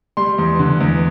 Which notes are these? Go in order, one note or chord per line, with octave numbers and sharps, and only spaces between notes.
G3 C6
E2
D3
E2